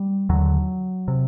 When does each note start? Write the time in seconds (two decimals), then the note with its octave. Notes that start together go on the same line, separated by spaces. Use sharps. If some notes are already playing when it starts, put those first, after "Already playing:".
Already playing: G3
0.29 D#2 D3 F#3
1.08 C3